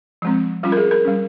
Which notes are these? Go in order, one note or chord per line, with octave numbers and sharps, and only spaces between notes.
F3 G#3 C4
G3 C#4 F4
A#4
G#4
A#4
G3 C#4